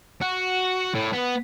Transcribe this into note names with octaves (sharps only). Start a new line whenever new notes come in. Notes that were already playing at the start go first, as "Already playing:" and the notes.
F#4
A2
B3